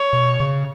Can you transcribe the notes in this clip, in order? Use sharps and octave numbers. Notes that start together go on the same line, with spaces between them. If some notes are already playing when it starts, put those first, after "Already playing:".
Already playing: C#5
B2
C#3